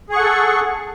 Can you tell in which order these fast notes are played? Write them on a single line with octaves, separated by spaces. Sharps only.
G#4 C#6 F#5 A4